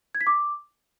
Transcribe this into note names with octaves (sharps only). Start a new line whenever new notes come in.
G#6
B6
D6